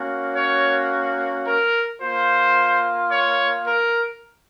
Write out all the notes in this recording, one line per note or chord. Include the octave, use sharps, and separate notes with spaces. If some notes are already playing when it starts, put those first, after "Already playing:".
Already playing: A#3 C#4 F#4
C#5
A#4
A#3 F4 C5
C#5
A#4